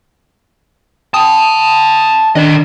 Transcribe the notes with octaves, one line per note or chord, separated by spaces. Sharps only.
F#5 G5 A5 D#6
D3 D#3 D4 D5 D#5